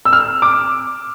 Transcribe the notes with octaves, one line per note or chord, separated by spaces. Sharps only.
E6
F6
D6